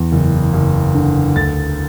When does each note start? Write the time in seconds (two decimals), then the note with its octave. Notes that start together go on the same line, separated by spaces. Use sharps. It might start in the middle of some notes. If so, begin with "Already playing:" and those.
Already playing: E2
0.12 F#1
0.53 F#1
0.95 D3
1.36 D2 A6